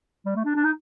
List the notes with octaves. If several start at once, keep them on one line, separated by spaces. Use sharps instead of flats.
G3
A3
D4
D4
D#4